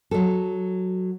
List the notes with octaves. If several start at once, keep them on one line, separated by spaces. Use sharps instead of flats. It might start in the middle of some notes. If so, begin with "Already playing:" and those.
F#3 A4